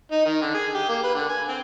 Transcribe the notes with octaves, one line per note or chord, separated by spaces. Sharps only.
D#4
D#3
D3
G#4
G4
A#3
B4
D3
G#5
C4